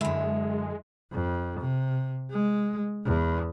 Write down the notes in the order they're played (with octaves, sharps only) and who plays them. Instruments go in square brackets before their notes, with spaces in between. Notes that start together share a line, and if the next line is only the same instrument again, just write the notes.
[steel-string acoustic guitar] F#2 D3 [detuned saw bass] G#3 [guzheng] E4
[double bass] F2
C3
G#3
E2